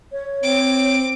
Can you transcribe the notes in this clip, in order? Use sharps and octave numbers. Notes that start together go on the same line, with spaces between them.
C#5
C4 D6